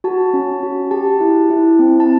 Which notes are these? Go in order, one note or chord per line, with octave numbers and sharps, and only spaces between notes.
F#4 A5
C#4
F#4
G4 A5
E4
E4
C4
A5